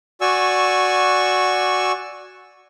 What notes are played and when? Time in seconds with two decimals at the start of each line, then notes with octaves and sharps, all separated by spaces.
0.21 F#4 D5 G#5 C#6 E6